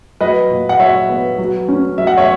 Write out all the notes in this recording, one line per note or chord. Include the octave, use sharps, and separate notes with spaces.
F#3 B4 D#5
A#2
F#5
F#3 C#5 E5
B3
F#3
C#4
F#3 E5
F#5
C#5 E5